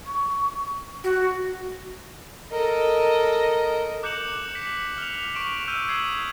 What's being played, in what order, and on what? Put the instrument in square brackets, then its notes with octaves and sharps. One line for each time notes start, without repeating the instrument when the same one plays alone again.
[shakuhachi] C#6
[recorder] F#4
[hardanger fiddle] A4 D#5 [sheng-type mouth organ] A#4
[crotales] D6 F#6 G6 C#7 E7 F#7
B6 C#7 F#7
F6 F7
C#6 D7 E7 F#7
E6 F6 G6 D#7 E7
D#6 E6 G#6 C7 D#7 F#7